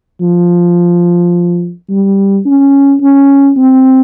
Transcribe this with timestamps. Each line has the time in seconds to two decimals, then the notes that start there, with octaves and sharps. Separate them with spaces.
0.21 F3
1.90 G3
2.45 C#4
3.01 C#4
3.57 C4